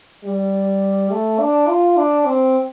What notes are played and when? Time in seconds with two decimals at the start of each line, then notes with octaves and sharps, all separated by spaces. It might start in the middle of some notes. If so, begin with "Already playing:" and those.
0.24 G3
1.11 A3
1.40 D4
1.68 F4
1.97 D4
2.26 C4